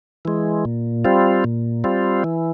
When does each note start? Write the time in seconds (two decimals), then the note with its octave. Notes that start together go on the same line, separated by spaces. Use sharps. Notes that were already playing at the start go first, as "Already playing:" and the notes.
0.25 E3 G#3
0.65 A#2
1.05 G3 C4 F4
1.44 A#2
1.84 G3 C4 F4
2.24 E3